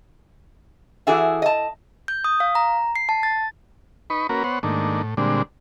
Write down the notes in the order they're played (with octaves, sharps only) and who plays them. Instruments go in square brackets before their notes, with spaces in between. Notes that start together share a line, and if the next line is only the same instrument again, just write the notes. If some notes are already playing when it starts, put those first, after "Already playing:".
[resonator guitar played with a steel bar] E3 E4 F#4 G#4 A4 E5
D#5 A5
[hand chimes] G6
D#6
F5
A#5
C7
A5
A6
[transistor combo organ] D#4 B4 B5 C#6
A#3 C#4 F#4 A#4 B4
B3 C5 C#5 F#5
G#2 D#3 A3 A#3 D4
A2
A#2 D3 G3 G#3 C4 D4